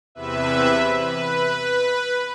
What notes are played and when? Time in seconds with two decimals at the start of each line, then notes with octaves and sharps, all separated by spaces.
0.15 E2 C3 B4 E5
0.96 B4